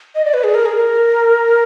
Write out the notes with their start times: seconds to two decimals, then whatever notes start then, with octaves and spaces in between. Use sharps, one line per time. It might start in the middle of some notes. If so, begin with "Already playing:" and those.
0.15 D#5
0.25 D5
0.34 B4
0.44 G#4
0.54 A#4
0.65 G#4
0.75 A#4